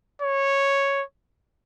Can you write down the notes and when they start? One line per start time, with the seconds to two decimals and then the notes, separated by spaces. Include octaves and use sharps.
0.22 C#5